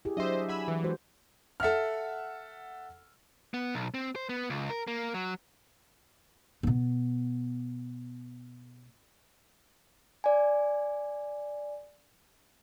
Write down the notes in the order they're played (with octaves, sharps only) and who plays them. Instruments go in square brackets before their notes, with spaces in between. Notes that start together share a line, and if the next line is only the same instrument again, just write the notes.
[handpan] E4 G4 G#4
[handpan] F#3 D4 E5 [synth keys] C5 D#5
[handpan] F#5 [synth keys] G#5 B5 E6
[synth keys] E3
[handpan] G#3 F#4 C5
[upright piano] A4 E5 F#5 F6
[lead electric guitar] B3
B1
C4
C5
B3
C#2
A#4
A#3
F#3
[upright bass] B2 B3
[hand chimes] D5 G#5